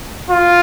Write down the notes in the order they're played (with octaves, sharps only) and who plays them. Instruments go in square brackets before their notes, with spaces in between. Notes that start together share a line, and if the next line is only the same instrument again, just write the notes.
[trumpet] F4